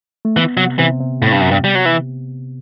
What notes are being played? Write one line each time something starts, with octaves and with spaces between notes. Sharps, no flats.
A3
E3 B3
C3 F#3
C3 E3
C3
A2 C3
G2
F#2
G2
G3
F#3
E3